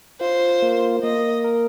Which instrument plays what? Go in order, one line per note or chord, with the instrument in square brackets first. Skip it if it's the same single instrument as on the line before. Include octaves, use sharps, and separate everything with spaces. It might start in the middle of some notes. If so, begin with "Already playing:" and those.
[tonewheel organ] F4 [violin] C5
[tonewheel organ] A#3
[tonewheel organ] A#3 [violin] D#5
[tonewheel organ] A#4